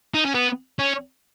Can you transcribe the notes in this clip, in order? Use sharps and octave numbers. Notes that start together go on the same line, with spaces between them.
D#4
C#4
B3
C#4